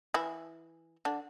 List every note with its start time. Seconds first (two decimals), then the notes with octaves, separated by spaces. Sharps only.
0.14 E3 E4
1.05 D3 D4